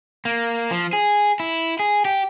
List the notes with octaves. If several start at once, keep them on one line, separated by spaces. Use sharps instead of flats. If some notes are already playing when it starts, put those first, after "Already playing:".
A#3
F3
G#4
E4
G#4
G4